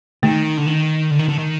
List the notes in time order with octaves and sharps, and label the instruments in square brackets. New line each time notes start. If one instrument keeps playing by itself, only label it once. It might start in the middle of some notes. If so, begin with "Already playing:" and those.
[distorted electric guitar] D#3 [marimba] A3
[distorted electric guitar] D3
D#3
D3
D#3
D3
D#3